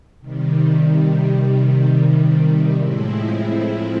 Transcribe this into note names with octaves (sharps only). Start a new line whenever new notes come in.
C3 D#3 G3
A2 F3 G#3 C4 E4